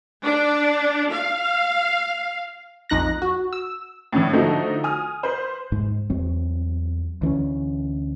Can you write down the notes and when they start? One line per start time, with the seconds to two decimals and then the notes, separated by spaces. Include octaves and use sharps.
0.24 D4
1.12 F5
2.90 A#1 F2 D#4 F#6 A#6
3.22 F#4
3.53 E6
4.13 A2 D3 E3
4.33 D3 F3 A3 D#4 F#4 A4
4.84 G#5 D#6 F6
5.23 B4 C5
5.72 G#2
6.10 E2 F#3 C4
7.22 D2 E3 C4 C#4